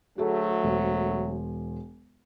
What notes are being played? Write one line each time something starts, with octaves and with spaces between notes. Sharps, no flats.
D2 F#3 A3 F#4 G#4 A4
E1 C5